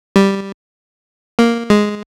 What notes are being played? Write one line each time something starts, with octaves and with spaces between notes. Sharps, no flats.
G3
A#3
G#3